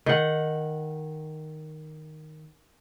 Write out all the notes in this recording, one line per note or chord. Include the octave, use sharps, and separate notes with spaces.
D#3 F#5